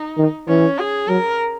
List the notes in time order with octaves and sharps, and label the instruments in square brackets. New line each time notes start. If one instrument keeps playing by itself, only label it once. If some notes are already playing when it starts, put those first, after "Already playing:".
Already playing: [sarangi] D#4
[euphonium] D#3
[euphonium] E3 [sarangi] C#4
[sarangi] G#4
[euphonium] F#3 [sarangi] A#4